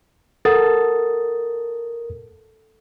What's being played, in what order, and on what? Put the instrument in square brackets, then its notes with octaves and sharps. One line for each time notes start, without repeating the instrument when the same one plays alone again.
[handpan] A4 F#5 [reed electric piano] A#4 D#6 A6